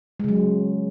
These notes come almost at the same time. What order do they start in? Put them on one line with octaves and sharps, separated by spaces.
G#3 C#3 F#3